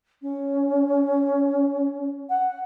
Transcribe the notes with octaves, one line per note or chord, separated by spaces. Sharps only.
C#4
F#5